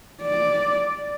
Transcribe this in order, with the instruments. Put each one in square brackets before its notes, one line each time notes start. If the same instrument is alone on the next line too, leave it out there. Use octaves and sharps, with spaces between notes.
[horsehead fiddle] D5